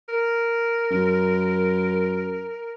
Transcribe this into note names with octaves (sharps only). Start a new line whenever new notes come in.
A#4
F#2